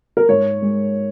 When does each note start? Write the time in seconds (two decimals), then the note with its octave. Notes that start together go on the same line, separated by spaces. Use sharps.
0.17 A#4
0.28 G#2 C#5
0.62 G#3